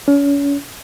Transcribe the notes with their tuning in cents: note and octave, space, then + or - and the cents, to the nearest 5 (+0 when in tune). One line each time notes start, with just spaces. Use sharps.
C#4 +35